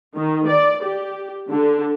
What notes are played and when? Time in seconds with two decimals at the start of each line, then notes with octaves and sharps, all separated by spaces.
0.15 D#3
0.48 D5
0.83 G4
1.49 D3